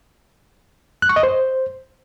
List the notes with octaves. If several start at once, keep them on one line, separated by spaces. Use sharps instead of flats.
F#6
C#6
D#5
C5